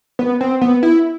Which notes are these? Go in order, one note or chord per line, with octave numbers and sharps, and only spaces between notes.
B3
C4
B3
E4